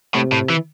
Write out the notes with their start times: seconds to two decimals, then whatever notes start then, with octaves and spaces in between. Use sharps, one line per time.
0.15 A2 C3
0.32 A2
0.50 E3